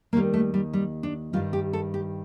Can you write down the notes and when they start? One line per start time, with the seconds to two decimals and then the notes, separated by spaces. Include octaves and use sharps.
0.13 D#2 D#3 G3 A#3
0.34 A3
0.54 G3
0.73 G3
1.03 D4
1.33 G2 D#3 G3 F4
1.53 G4
1.73 A4
1.94 G4